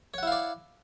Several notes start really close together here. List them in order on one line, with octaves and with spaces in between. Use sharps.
C#5 F#5 E4 F5 D5